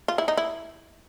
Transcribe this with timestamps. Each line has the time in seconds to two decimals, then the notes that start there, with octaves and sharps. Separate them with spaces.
0.08 F4
0.18 E4
0.28 D#4
0.37 E4